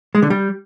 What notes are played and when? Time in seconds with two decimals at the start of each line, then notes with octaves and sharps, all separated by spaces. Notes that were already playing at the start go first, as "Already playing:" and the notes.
0.15 G#3
0.22 D3
0.30 G3